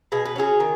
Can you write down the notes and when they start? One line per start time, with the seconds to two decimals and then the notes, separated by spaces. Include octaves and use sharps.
0.12 B2 G#4
0.25 B4
0.36 F#3 C#4 G#4
0.60 D#3